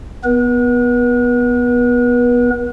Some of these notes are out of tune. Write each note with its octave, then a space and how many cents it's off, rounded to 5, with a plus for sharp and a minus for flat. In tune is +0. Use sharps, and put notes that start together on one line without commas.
B3 +0 B4 -40